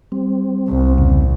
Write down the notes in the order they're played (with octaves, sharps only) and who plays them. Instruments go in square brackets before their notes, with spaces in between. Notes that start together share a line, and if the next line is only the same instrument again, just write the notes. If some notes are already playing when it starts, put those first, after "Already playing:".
[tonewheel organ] G3 C4
[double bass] C2
[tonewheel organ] E2 A#2 C#3